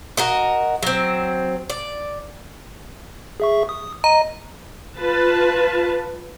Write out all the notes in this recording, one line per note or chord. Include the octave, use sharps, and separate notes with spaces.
F#4 A#4 D#5
F#3 C4
D5
G#4 E5 C#6
D#6
D#5 A#5
F4 B4 A5